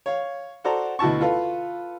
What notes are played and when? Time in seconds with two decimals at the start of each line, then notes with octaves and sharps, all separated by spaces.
0.06 C#5 F5
0.64 F#4 A4 C5 D5 A#5
0.99 D2 B2 E4 A5 C#6
1.21 F4 A4 B4 F5